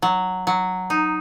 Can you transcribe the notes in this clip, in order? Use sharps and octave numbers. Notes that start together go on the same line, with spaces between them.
F#3
F#3
D#4